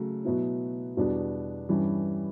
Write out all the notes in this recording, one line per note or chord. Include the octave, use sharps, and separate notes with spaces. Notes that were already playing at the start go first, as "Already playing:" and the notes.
Already playing: C#3 F#3 A3
B2 F#3 B3 E4
E2 B2 G3 B3 D4
G2 E3 G3 C#4